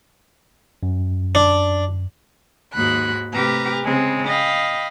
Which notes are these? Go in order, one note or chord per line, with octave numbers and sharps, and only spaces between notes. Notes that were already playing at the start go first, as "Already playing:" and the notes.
F#2
D4
D#2 G#2 G#3 F#4 B5 F#6
C3 A3 G4 B4 A#5 F6
C#3 G#3 C4
D#5 F5 G5 B5